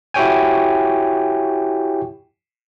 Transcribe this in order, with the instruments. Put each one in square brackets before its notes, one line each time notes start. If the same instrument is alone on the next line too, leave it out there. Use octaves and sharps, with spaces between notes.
[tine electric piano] E4 F#4 G4 C#5 G5 G#5